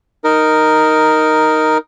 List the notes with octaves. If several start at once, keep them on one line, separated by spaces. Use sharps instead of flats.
D#4 A#4